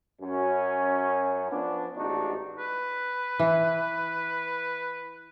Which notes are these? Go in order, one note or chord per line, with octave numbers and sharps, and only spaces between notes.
F#2 C#4
F3 B3 D4
A1 G#2 D4 D#4 F#4
B4
E3 E4